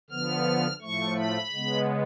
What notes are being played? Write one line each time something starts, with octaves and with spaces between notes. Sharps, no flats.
D3 F3 B3 F6
A2 F3 A3 C#6
B5
C#3 G#3 B3